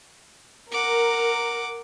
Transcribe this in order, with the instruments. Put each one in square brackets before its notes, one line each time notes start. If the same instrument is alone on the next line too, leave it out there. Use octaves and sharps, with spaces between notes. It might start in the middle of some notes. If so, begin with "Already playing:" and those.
[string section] A#4 [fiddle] F#5 D6